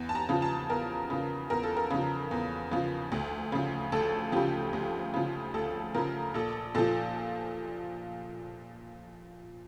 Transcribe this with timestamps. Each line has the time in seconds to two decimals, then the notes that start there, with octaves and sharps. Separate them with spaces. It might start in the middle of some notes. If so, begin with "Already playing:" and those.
Already playing: E2
0.09 A5
0.15 A#5
0.29 C#3 F3
0.42 A5
0.70 E2 A#4
1.10 C#3 F3
1.50 E2 A#4
1.63 A4
1.77 A#4
1.90 C#3 F3
2.31 E2
2.71 C#3 F3
3.12 D2
3.52 C#3 F3
3.92 D2 A4
4.32 C#3 F3 G4
4.73 D2
5.14 C#3 F3
5.54 D2 A4
5.94 C#3 F3 A#4
6.34 A#1 A4
6.75 A#2 F3 A4